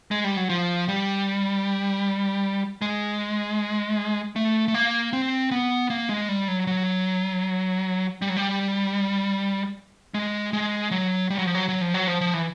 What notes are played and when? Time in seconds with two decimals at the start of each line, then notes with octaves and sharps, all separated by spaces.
0.11 G#3
0.24 G3
0.37 F#3
0.49 F3
0.88 G3
2.82 G#3
4.36 A3
4.68 A3
4.74 A#3
5.13 C4
5.51 B3
5.90 A#3
6.09 G#3
6.29 G3
6.48 F#3
6.67 F#3
8.22 G3
8.29 F#3
8.36 G3
10.14 G#3
10.53 G#3
10.91 F#3
11.30 G3
11.39 F#3
11.46 F3
11.55 F#3
11.69 F#3
11.81 F3
11.94 F#3
12.07 F3
12.21 F3
12.33 E3